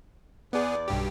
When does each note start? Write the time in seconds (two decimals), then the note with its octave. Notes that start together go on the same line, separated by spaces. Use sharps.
0.53 E2 B3 G#4 B4 D5
0.88 B1 G2 G4